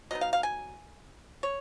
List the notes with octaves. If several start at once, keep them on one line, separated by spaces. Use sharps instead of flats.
F#3 B3 D#4 D#5
F5
F5
G#5
C#5